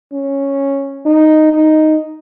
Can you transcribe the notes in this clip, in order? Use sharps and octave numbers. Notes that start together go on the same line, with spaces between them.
C#4
D#4
D#4